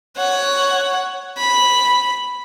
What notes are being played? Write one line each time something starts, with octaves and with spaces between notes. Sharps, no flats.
C#5 F#5
B5